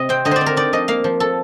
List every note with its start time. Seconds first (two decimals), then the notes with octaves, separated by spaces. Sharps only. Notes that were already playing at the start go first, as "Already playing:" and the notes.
Already playing: C3 D#5
0.09 C4 G5
0.25 D3 D#5
0.31 C5 D5
0.41 C4
0.46 A#4
0.56 D#4 D5
0.73 F3 D#5
0.88 A#3 F5
1.04 F3
1.20 A4